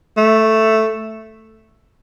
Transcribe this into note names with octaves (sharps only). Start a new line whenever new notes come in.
A3